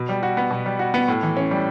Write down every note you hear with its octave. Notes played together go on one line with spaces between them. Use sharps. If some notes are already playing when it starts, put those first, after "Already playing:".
Already playing: B2
G3
F#4
B3
B2
G3
F#4
B3
A2
E3
C#4
G3